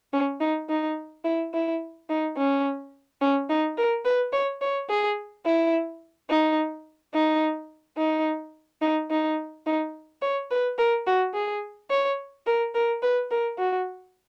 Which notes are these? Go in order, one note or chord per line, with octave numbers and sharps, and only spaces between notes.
C#4
D#4
D#4
E4
E4
D#4
C#4
C#4
D#4
A#4
B4
C#5
C#5
G#4
E4
D#4
D#4
D#4
D#4
D#4
D#4
C#5
B4
A#4
F#4
G#4
C#5
A#4
A#4
B4
A#4
F#4